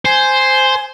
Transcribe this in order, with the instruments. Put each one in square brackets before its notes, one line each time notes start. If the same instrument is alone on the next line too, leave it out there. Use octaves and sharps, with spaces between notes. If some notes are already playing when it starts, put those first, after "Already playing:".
[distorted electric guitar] C5 [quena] G#5